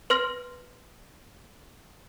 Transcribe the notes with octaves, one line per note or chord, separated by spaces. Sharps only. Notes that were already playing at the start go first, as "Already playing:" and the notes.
B4 C6 F6 A#6